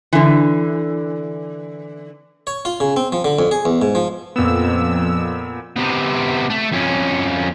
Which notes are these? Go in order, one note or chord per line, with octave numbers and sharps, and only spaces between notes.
D3 E3
C#5
F4
C#3
C4
F3
D3
F2
G#4
E2
G#2
F3
F2 A#2 B3 E6
C3 B3
A3
F2 C#4